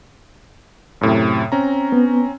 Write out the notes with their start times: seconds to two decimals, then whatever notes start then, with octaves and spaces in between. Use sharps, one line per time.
1.01 F#2 A2 C3
1.52 C4 C#4 A#5
1.92 B3